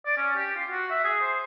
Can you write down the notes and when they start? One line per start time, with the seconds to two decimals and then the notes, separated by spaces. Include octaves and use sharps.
0.06 D5
0.17 C#4
0.36 G4
0.56 F4
0.69 F#4
0.90 E5
1.04 G#4
1.21 C5